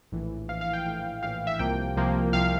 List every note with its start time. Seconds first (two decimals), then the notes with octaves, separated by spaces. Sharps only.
0.12 A#1 A2 E3
0.49 A#1 A2 E3 F5
0.61 F5
0.73 G5
0.85 A#1 A2 E3 G5
1.23 A#1 A2 E3 F5
1.47 E5
1.59 C2 C3 F3 A#3 G5
1.96 C2 C3 F3 A#3
2.33 C2 C3 F3 A#3 F5